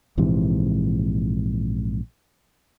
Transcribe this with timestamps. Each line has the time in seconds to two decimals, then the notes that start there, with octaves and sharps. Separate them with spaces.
0.17 A#1 G#2 C3 E3